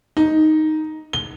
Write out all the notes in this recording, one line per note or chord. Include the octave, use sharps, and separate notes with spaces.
D#4
G7